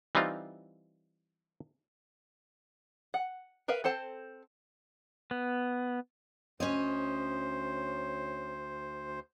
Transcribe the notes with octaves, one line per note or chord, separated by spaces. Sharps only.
E3 G3 C4 D#4 F4
F#5
A#4 B4 E5 F5
C4 A4 C5 A5
B3
D2 C#4 C5 C#5 D#5